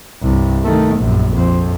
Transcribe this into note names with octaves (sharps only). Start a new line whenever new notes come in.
C2 G2
D#3 A3
A#1 F#2
F2